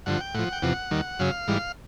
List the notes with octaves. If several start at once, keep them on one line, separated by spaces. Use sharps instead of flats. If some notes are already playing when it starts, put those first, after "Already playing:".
G2 D3 F3 F#5
G5
A2 F3 F#5
G5
E2 C3 F3 F#5
D#2 D#3 G3
F#2 C#3 F#3 F5
G#2 E3 G3